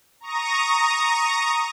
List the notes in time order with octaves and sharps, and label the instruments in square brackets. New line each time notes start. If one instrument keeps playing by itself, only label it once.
[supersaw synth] A#5 C#6 D#6 A#6